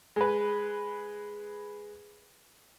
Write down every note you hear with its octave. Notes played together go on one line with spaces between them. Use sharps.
G#3 B4